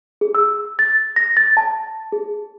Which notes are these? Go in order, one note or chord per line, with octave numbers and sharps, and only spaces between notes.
G#4
E6
A6
A#6
A6
A5
G#4